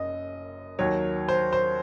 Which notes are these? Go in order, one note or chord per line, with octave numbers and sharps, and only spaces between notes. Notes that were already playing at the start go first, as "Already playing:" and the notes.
Already playing: F#1 F#2 D#5
D#2 D#3 F#3 C#5
C5
C5